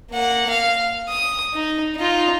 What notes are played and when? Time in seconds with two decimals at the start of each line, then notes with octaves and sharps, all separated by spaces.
0.11 A#3 F#5
0.50 F5
1.09 D#6
1.54 D#4
1.96 D#4 F4